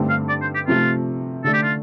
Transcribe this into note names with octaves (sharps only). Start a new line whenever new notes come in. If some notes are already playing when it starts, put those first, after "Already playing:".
Already playing: G2 D3 A3 C4 G4
F5
D5
C5
G4
C3 F3 A3 F4
D3 A3 D4 A4
G4
F4